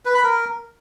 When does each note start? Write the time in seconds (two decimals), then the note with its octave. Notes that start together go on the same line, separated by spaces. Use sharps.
0.05 B4
0.14 B5
0.23 A#4